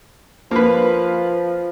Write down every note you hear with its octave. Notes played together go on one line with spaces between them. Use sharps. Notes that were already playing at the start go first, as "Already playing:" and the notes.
F3 A#3 B4